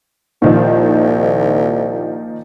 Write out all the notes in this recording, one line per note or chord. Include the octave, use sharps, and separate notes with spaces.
C2 A#2 D#3 F3